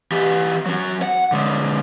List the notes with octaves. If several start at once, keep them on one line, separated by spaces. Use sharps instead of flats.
E3 G4
F#3 C#4
F#5
D3 G#3